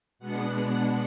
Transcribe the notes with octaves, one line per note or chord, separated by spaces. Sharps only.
B2 G#3 B3 D4 F#5